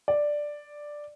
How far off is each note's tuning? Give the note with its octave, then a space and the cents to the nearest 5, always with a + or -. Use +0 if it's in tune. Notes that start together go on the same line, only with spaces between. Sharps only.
D5 +5